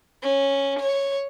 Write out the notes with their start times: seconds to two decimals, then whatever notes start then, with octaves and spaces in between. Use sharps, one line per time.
0.23 C#4
0.80 C#5